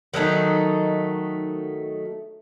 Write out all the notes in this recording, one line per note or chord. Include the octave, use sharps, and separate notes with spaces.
D#3 F#3 A3 D#4